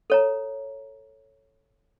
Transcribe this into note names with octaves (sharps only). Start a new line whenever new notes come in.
A4 C#5 A#5